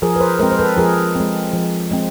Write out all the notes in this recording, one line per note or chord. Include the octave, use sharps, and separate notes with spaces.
F3 G#4 A#4
B4
A#4 C5
G#3 C4 A#4 C5
C5
A4 B4
F3 G#4 A#4
G#3 C4
F3
G#3 C4